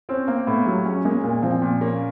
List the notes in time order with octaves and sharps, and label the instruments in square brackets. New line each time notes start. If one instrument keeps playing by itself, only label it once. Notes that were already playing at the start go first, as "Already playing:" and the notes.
[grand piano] C4 [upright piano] C#4
[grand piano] A#3 [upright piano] C4
[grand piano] A2 [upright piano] B3
[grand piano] F#3 [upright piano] G3
[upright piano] G#3 [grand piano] C#4
[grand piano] G#3 [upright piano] A#3
[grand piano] A#2 [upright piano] A#3
[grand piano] F3 [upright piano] C4
[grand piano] A#2
[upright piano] A#3 [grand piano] C#4